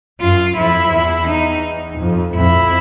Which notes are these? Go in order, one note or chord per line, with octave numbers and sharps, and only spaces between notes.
F#2 F4
F2 E4
E2
D#4
F2
F2 E4